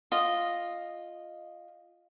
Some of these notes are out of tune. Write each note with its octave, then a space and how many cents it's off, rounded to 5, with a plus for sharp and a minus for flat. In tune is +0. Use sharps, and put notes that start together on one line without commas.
F4 +0 D#5 -5